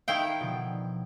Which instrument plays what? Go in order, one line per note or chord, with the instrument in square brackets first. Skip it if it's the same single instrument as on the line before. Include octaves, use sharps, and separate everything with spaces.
[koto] D#3 E4 G5 [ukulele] D#4 F5
[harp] B2 D3 F3